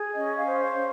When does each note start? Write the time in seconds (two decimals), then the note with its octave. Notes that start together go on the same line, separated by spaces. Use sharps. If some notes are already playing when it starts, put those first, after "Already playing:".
Already playing: G#4
0.13 C#4 D#5
0.36 F5
0.44 C5
0.61 F5
0.75 C#4